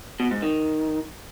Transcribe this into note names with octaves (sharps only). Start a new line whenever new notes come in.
B2
G#2
D#3